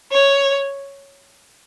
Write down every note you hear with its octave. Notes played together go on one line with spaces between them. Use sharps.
C#5